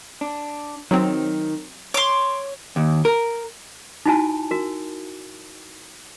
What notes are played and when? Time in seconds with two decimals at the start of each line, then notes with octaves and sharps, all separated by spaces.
0.21 D4
0.91 D#3 F#3 C4
1.94 C#5 C6 D6
2.76 D#2
3.05 A#4
4.06 D#4 E4 F#4 G#5 A5
4.51 F#4 A#4